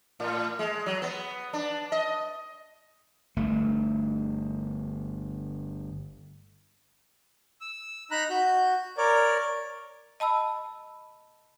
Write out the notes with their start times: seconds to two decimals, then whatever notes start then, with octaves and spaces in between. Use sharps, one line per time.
0.20 A2
0.59 G#3
0.86 F#3
1.02 B3
1.53 D4
1.92 D#5
3.36 G1 A3
7.61 E6
8.11 D#4 A#5 B5 F#6
8.30 F#4 G6
8.97 A#4 C#5 D5
10.20 D#5 A5 B5 E6